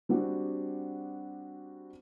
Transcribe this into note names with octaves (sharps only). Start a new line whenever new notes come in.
G3 C4 D4 F#4